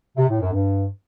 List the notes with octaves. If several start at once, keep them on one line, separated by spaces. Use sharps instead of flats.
C3
A2
F#2
G2